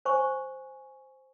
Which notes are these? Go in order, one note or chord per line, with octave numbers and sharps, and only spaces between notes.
C5 G#5 C#6